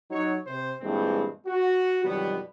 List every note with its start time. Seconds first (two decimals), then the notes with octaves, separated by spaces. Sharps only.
0.11 F#3 D#4 C#5
0.47 C3 C5
0.81 G2 A#2 E3 G#3 B3 C4
1.47 F#4
2.05 F2 B2 D#3 F#3 G3 B3